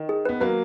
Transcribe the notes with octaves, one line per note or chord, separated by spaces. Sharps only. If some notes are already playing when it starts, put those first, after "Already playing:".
Already playing: D#3
G#4
B3 B4
F#3 A#3 B4